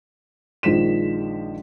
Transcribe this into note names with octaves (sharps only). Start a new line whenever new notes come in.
A#1 D#3 F3 G#3 B6 E7